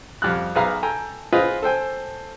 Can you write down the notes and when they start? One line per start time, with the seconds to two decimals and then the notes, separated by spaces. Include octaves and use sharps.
0.22 F2 G3 F6 F#6
0.55 B1 G#4 B4 F5 A#5 F6
0.83 A4 G5 G#5 A#5
1.33 F4 G#4 B4 C5 D#5
1.62 A4 C5 G5 G#5